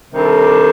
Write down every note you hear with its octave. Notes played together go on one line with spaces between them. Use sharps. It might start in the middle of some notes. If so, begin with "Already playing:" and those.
C3 D#3 G3 D4 A4